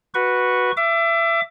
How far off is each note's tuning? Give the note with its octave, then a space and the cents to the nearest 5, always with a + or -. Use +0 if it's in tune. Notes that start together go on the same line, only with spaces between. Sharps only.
F#4 -5 B4 -5 C#6 +0
E5 +25 D6 +0